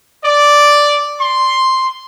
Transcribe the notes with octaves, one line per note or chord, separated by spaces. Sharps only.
D5
C6